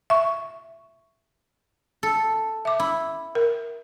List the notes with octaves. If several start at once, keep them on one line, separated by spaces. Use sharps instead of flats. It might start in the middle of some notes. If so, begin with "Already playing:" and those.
E5 C#6
A4
E5 D6
E4
A#4